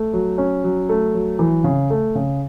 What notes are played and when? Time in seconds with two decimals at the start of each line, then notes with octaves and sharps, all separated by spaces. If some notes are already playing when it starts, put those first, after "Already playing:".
Already playing: A3
0.13 F#3
0.38 C#4
0.64 F#3
0.89 A3
1.14 F#3
1.39 E3
1.64 C#3
1.90 A3
2.15 C#3